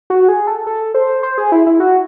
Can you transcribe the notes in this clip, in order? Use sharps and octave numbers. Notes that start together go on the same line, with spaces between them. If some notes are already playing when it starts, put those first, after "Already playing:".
F#4
G#4
A4
A4
C5
C5
G#4
E4
E4
F#4